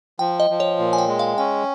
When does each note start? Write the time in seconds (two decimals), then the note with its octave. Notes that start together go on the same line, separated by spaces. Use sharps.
0.19 F3 G5
0.40 D#5
0.50 F3
0.60 C#5
0.79 A#2
0.93 G#5
0.98 G5
1.08 G#3
1.19 F5
1.38 C#4 G5